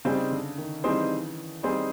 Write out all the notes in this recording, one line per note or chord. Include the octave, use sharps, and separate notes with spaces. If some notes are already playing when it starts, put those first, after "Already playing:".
C#3 G3 C4 D#4 G#4 C5
D3
D#3
E3 G3 C4 D#4 G#4 C5
G3 C4 D#4 G#4 C5